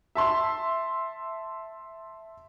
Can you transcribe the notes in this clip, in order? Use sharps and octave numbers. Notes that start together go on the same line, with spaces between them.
E5 A5 C6